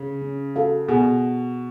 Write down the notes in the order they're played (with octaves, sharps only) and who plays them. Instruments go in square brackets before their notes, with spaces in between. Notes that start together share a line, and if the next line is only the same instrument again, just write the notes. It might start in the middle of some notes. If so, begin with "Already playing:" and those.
Already playing: [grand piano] C#3
[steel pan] C#4
F#4 A4 F5
[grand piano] B2 [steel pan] G#4